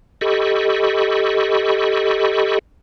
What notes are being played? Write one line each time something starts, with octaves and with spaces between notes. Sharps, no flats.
G4 A4 D#5 B5 C#6